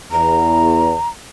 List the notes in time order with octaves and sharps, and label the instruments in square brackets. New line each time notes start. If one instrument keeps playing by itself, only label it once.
[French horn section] E2 [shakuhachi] A#5